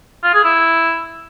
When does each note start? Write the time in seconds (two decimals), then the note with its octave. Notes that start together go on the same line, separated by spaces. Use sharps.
0.23 F4
0.34 G#4
0.44 E4